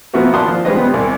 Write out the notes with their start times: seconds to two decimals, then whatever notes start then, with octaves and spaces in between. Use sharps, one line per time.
0.13 F3 A#3 B3 E4 F#4 B4
0.34 D5 A5 B5 C6 D#6 F#6
0.49 F3
0.65 G3 G#3 G#4 B4 C5 D#5
0.76 B3 C4 G4
0.94 C2 D5 G#5